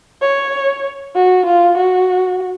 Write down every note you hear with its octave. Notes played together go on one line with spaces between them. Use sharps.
C#5
F#4
F4
F#4